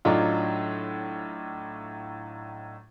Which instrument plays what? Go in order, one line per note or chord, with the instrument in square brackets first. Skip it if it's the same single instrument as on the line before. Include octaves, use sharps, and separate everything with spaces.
[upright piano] A2 F#3 D4 D#4 F4